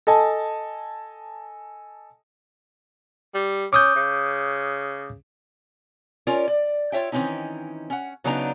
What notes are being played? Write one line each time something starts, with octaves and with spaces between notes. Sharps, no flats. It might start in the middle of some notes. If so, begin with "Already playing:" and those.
A4 D#5 G#5 A5
G3
C#4 D6 D#6 G6
C#3
C#4 F4 A#4 C#5 D5
D5
F4 C#5 E5 G5
D#3 E3 A#3 C4 C#4 D#4
C#4 F#5
C#3 F#3 B3 D4 D#4 A#5